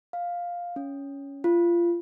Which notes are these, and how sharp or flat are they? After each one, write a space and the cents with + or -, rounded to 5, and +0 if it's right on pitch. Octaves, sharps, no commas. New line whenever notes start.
F5 +5
C#4 +10
F4 -25